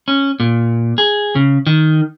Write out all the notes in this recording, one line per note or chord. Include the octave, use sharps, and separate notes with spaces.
C#4
A#2
G#4
C#3
D#3